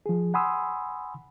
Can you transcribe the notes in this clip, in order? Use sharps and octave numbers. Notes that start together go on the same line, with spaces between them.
F3 G#4
F#5 G#5 B5 C6 D#6 E6